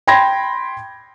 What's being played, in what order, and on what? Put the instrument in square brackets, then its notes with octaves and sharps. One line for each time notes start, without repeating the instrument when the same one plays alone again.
[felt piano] G5 B5 C6 G#6 A#6